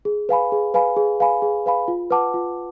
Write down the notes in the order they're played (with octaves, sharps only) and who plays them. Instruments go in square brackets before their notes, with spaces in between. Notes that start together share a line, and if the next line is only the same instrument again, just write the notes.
[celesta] G#4
B4 F5 G#5 B5
G#4
B4 F5 G#5 B5
G#4
B4 F5 G#5 B5
G#4
B4 F5 G#5 B5
F4
B4 F#5 A5 D6
F4